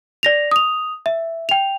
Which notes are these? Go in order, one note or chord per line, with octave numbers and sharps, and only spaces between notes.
D5 A#6 F7
D#6 F7
E5
G5 F7